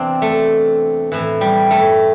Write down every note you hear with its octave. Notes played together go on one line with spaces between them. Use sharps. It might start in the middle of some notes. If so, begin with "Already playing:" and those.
Already playing: E2 C3 E3 C4 D4
A3
A2 E3
G3
A3